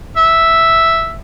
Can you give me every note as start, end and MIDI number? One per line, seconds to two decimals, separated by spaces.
0.17 1.15 76